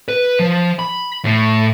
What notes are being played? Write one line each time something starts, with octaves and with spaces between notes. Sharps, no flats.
B4
F3
B5
A2